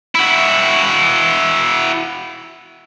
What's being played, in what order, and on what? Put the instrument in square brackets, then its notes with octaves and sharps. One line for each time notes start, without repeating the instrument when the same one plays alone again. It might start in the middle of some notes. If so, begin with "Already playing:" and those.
[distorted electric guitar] E4 F#4